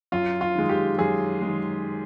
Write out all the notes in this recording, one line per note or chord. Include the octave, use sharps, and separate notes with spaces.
F#2 F4
F4
D#3 G#3
G4
F#2 G#4
D#3 G#3